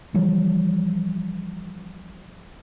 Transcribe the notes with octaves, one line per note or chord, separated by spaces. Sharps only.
E3 F3 G3